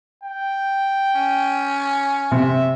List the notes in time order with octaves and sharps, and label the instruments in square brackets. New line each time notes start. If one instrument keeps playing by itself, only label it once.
[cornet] G5
[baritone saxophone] C#4
[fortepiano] C3 [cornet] E5